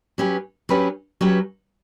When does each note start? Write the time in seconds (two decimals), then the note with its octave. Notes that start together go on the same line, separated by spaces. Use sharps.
0.18 F#3 C#4 G4 B4
0.69 F#3 C#4 G4 B4
1.21 F#3 C#4 G4 B4